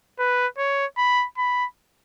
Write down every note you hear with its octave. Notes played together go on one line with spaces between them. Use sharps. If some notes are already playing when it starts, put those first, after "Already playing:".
B4
C#5
B5
B5